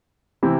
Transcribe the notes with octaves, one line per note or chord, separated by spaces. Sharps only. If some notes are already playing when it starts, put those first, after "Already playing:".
C3 E3 C4 E4